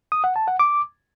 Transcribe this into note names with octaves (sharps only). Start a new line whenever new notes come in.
D#6
F#5
A5
F#5
D6